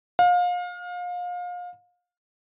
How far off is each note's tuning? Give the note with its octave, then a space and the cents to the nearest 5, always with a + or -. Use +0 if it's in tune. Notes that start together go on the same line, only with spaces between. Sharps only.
F5 +30